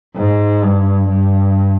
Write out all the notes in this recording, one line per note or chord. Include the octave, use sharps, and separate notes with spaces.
G#2
G2
G2